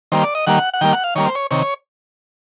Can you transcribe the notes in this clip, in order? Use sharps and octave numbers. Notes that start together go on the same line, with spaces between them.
D#3 G3 A#3 C5
D5
D#5
D#3 G3 A#3 F#5
F#5
D#3 G3 A#3 G5
F#5
F5
D#3 G3 A#3 C#5
C5
C#5
C3 D#3 C#5